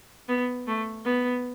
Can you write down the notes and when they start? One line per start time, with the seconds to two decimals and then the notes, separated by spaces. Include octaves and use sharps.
0.28 B3
0.67 A3
1.05 B3